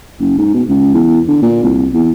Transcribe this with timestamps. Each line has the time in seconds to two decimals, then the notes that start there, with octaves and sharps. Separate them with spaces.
0.20 F#1
0.38 G#2
0.54 B2
0.69 C#2
0.94 E2
1.28 D3
1.42 A#2
1.63 C2
1.93 E2